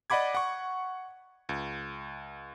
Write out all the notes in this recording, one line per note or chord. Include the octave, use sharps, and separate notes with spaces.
D5 D#5 F#5 B5 D6 G#6
F#5 C#6
C#2